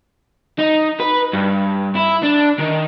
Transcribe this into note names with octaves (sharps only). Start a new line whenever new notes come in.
D#4
B4
G2
E4
D4
D#3